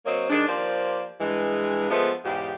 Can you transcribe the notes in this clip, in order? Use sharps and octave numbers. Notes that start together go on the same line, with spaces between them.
F#3 A#3 C4 C#5 D#5
D#3 G#3 D4
F3 A#3 G4 C5 D5
G2 E3 G#3
F3 G#3 A3 B3
E2 G#2 C#3 G4